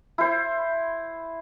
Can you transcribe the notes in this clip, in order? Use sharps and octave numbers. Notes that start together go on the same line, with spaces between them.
E4 C5